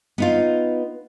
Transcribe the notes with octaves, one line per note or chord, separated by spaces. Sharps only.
B3 D#4 F4